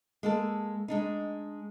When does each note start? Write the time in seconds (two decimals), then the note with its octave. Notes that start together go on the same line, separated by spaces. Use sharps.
0.23 G#3 A#3 A4
0.88 G#3 D4 D#4